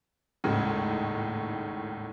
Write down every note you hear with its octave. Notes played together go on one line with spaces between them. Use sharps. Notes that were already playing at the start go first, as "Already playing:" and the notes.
G#1 D#2 A2 C#3 G#3